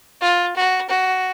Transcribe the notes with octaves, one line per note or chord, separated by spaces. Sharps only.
F4
F#4
F#4